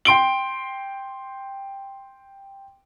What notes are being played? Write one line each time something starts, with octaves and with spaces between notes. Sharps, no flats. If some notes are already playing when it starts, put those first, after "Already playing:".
G5 C6 D7 G7